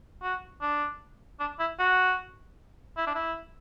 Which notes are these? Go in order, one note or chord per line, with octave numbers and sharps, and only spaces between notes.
F#4
D4
D4
E4
F#4
E4
D4
E4